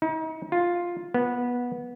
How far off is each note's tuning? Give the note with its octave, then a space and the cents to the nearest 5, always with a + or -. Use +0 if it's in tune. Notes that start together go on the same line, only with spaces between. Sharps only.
D#4 +40
F4 +5
B3 -15